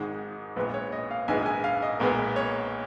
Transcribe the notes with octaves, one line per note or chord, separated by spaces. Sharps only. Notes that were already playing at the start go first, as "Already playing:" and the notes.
Already playing: G#1 G#2 D#3 G#3
A#1 A#2 G#3 B3 B4
C#5
D#5
F5
A#1 G#2 D#3 G#3 B3 G#5
G#5
F5
D#5
B1 A#2 G#3 B3 A#4
C#5